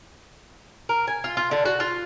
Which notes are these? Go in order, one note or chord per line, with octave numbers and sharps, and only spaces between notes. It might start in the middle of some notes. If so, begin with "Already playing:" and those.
A#4
G#5
F4
F4
D3
F#4
F4